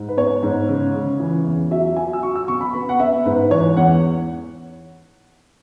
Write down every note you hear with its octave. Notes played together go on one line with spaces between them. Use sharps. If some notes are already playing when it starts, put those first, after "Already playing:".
Already playing: G#2
B4
B3 C#5
G#2
C#3
C#3
E3
E2
F#3 E5
F#3 G#5
E6
F#3 C#6
E6
B2 C#6
B5
B3 B5
F#5
B3 E5
G#2 B4
E3 C#5
E2 F#5